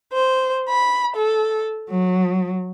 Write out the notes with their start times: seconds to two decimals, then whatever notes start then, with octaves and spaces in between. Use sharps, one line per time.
0.13 C5
0.69 B5
1.16 A4
1.90 F#3